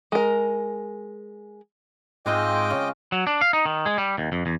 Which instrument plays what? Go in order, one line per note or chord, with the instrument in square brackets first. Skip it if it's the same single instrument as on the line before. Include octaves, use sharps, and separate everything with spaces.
[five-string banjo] G#3 A#4
[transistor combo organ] G#2 [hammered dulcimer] G#3 C4 F4 [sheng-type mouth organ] D#5 G5 D6
[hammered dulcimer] C#3
[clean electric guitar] F#3
D4
F5
D#4
D#3
G#3
G3
D#2
F2
E2